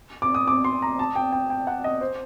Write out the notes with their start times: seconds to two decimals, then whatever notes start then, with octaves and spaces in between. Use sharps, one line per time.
0.22 D6
0.35 D#6
0.48 D6
0.64 C6
0.82 A#5
0.99 A5
1.16 G5
1.32 G5
1.50 G5
1.67 F#5
1.84 D#5
2.01 C5